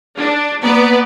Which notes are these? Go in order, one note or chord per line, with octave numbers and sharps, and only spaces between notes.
D4
A#3 B3 D5